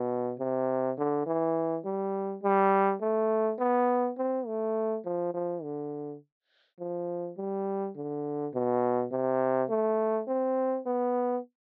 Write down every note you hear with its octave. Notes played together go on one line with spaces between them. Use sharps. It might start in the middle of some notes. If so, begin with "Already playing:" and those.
Already playing: B2
C3
D3
E3
G3
G3
A3
B3
C4
A3
F3
F3
D3
F3
G3
D3
B2
C3
A3
C4
B3